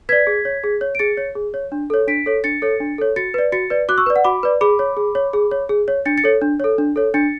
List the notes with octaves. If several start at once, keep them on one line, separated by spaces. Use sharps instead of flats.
B4 D5 G#6 B6
G#4
C#5
G#4
C#5
D7
G#4 A6 C#7
C#5
G#4
C#5
D4
A4 C#5
D4 B6 D7
A4 C#5
D4 A6 C#7
A4 C#5
D4
A4 C#5
F#4 A6 C#7
B4 D5
F#4 A6 C#7
B4 D5
F#4 D6 F#6
C#6 E6
B4 D5
F#5
F#4 B5 D6
B4 D5
G#4 B5 D6
C#5
G#4
C#5
G#4
C#5
G#4
C#5
D4 A6 C#7
A6 C#7
A4 C#5
D4
A4 C#5
D4
A4 C#5
D4 A6 C#7